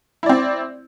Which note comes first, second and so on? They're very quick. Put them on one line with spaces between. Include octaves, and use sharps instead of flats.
E4 D5 C4